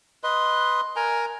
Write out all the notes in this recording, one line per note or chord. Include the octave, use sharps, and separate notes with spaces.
B4 D#5 C6
A#4 G#5 A#5